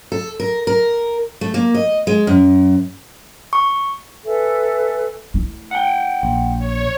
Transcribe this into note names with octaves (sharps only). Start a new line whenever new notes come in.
A4
A#4
A#4
A3
A#3
D#5
G#3
F#2
C#6
A4 B4 E5 G#5
A3 E4
F#5 G5
A#1
C#5